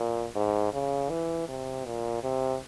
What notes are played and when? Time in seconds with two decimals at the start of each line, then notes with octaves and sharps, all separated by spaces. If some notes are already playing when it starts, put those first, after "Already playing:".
Already playing: A#2
0.35 G#2
0.73 C#3
1.10 E3
1.48 C3
1.85 A#2
2.23 C3